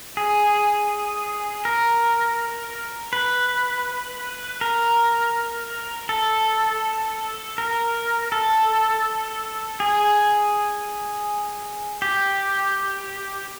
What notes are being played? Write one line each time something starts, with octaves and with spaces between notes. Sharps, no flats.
G#4
A#4
B4
A#4
A4
A#4
A4
G#4
G4